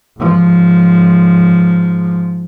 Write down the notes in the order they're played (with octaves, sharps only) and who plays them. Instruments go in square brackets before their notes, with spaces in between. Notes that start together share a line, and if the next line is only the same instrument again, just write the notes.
[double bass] G#2 F3